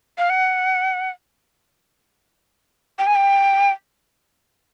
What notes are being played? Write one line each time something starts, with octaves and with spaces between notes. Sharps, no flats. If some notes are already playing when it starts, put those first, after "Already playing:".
F5
F#5
G5
G#5
G5